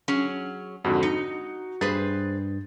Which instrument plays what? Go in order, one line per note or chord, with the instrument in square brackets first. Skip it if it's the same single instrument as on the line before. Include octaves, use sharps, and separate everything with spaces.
[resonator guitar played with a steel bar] F#3 C#4 G#4
[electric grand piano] F2 G#2 D3 [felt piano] F#4
[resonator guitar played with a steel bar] D#4 [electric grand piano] C#7
[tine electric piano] G2 [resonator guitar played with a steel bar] G#4 B4 C5 [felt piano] A6